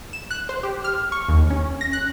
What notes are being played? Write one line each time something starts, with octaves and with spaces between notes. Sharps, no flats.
E7
F#6
C5
G4
F6
C#6
D#2
C#4
A#6
F#6